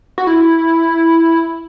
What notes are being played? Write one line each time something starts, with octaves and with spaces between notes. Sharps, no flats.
F#4
E4